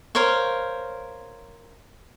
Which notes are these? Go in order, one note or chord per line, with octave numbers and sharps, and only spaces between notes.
A#4 C5 C#5 F5